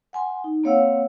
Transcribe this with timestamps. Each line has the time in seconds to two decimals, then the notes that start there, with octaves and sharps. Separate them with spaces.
0.13 F#5 G#5 C6
0.44 D#4
0.64 A#3 C4 C#5 F5 F#5 E6